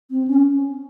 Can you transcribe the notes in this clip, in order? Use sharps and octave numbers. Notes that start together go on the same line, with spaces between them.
C4
C#4